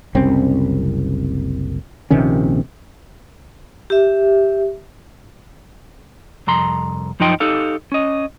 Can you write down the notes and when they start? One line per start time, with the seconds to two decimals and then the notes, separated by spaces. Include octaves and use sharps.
0.15 F#1 C2 C4 C#4
2.10 A#1 C3 D#3 C#4
3.90 G4 E5
6.47 C2 F2 A#5 C6
7.20 F#2 F3 D#4 D#5 G5 C6
7.40 D#4 G4 A4 F5
7.92 C#4 D#5